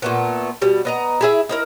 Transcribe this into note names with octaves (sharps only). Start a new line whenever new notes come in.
A#2 A3 B3
B2 G3
B3 D#5 A#5
E4 G#4 E5
D#4 E4 A#4